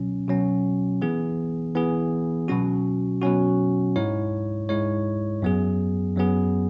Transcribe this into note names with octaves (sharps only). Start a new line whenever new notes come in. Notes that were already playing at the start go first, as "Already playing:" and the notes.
Already playing: B2 F#3 C#4
B2 F#3 C#4
E3 B3 G#4
E3 B3 G#4
B2 F#3 C#4 F#4
B2 F#3 C#4 F#4
G#2 G#3 E4 C#5
G#2 G#3 E4 C#5
F#2 F#3 B3 G#4
F#2 F#3 B3 G#4